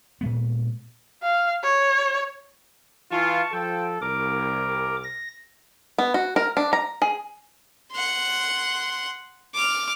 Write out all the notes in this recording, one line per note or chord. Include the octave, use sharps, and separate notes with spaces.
A#2 G#3 B3
F5
C#5
E3 F4 A5 C#6
F3 A4 G5
C2 A#4 D6
A#6
B3
F#4
A#4
D4
A#5
G#4
F#5 C6
D6 F6